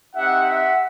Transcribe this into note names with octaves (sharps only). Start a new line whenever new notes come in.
C4 D#4 G4 E5 F#5
E5 F#5